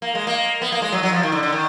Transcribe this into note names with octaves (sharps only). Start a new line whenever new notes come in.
A#3
G#3
A#3
B3
A#3
G#3
F#3
F#3
F3
D#3
D3
D3
D#3